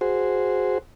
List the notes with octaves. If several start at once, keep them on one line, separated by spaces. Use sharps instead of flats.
F#4 G#4 C5